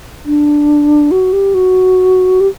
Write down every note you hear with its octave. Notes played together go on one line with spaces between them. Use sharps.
D4
F#4
G4
F#4
G4